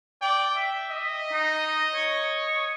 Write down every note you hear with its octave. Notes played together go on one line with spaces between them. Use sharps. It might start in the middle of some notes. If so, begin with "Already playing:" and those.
D5 G5
E5
D#5
D#4
C#5